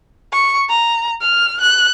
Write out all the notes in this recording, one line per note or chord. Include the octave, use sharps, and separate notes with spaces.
C#6
A#5
F6
F#6